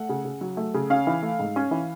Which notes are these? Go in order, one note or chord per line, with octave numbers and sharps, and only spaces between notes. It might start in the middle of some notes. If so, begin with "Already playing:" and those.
Already playing: A3 F#5
C#3
C#3
F#3
A3
C#3
C#4 F5
E3
A3
G#2
C#4
E3